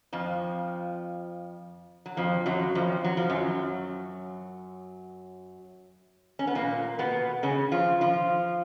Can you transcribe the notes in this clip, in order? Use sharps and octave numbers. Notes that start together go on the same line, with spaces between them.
F2 F3
F#3
F2 F3
F#2 F#3
F2 F3
F#3
F3
F#2 F#3
C#4
B3
A#2 A#3
B2 B3
C#3 C#4
F3 F4
F3 F4